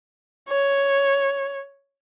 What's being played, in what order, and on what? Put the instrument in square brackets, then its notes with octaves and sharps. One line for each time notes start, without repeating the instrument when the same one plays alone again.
[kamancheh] C#5